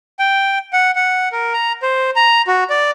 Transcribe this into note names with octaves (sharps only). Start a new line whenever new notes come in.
G5
F#5
F#5
A#4
A#5
C5
A#5
F#4
D5